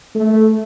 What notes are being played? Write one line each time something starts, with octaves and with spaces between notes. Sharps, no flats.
A3